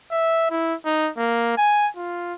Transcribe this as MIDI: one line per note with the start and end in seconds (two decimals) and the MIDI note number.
0.11 0.46 76
0.51 0.75 64
0.85 1.10 63
1.17 1.56 58
1.58 1.88 80
1.97 2.34 65